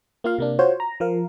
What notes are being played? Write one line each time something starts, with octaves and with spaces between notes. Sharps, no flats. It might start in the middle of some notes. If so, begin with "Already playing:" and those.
A#3 F4 F5
C3 A#3 D4
F4 F#4 C5 C#5
A#5
F3 A#4 F5